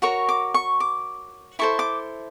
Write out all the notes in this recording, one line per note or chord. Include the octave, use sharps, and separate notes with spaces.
F#4 A#4 C#5 C#6
D6
C#6
D6
E4 A4 C5 C#6
D6